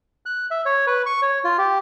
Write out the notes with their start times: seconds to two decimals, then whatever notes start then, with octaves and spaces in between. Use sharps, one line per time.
0.26 F#6
0.51 E5
0.66 C#5
0.87 B4
1.06 C#6
1.22 C#5
1.44 F4
1.58 G4